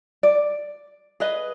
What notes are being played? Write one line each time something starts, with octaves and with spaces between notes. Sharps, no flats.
D5
G#4 B4 D#5